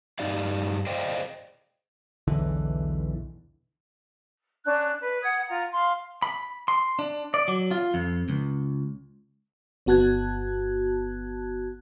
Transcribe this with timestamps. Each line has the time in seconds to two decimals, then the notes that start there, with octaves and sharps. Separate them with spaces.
0.19 G2 D#4 G4 D5 F5
0.87 C5 D5 D#5 F5 G5
2.27 B1 E2 D3 E3
4.65 C#4 D4 F#6
5.00 B4
5.22 F#5 D#6 G#6
5.49 F4 A#5
5.72 F5 C6
6.22 B5
6.68 C6
6.99 D4
7.34 D5
7.48 F#3
7.71 F4
7.94 F2
8.29 C#2
9.86 G1 B3 F#4 A5 F#6 G#6